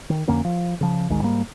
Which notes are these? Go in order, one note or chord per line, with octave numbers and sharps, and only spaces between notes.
D#3
F2 D3 A#3 C#4
F3
C#3 F3
G#1 D2 D#3 G#3
G#2 G3 A#3